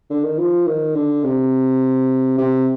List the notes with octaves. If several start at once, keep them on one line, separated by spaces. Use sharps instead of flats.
D3
D#3
F3
D#3
D3
C3
C3